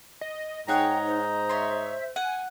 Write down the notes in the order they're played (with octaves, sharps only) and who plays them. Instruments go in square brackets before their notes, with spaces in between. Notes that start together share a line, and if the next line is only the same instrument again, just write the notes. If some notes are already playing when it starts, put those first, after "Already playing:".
[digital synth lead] D#5
[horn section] G#2 D#5 A#5 [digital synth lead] D#4 [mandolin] G#4 C#5 F#5 [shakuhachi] G5
[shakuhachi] C5
[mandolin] C#5 C6 [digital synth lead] E5
[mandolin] F#5 [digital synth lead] G#5